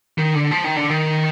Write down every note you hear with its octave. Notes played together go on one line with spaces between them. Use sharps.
D#3
D3
F3
D#3
D3
D#3